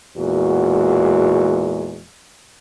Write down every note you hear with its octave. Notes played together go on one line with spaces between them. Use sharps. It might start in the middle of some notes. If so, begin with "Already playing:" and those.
E2 A#2 G#3 F#4